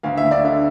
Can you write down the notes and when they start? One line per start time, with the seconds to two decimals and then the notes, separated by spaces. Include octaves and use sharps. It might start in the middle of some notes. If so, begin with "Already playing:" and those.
0.03 D2 F5
0.17 E5
0.23 D2
0.31 D5
0.44 D3 E5